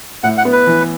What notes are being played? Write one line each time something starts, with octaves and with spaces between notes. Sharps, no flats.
A2 F#5
F#5
B3
B4
E3